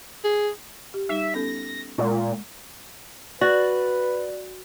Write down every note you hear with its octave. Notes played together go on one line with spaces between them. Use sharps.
G#4
G4
G3 D#4 E5
B3 C#4 A4 A#6
A#2 G#3 C#6
F#4 B4 D5